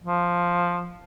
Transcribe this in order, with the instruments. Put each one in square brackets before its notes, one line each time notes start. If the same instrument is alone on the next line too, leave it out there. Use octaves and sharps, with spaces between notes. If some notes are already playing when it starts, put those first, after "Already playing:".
[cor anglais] F3